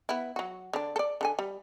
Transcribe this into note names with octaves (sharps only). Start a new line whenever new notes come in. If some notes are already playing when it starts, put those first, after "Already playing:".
B3 E4
F#3 F#4
D3 D4
A4 D5
D3 A4 G#5
G3